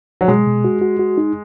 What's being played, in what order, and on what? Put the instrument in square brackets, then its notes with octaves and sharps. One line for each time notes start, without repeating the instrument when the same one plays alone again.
[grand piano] F#3
[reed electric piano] B2 [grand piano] G#3
[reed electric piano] B2
F#4
F#4
F#4
D#4